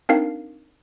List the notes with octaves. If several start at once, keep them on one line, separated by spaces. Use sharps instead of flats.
C4 D4 D#4 A#4 F5 C7